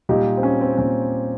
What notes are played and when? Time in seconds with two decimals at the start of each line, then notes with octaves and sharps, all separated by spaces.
0.09 A#2 G3 D#4 G4
0.37 C4
0.43 C#4
0.61 C4
0.78 A#2 C#4